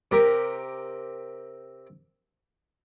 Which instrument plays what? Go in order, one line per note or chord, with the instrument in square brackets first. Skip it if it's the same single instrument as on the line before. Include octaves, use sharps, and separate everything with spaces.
[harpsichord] C3 G4 A#4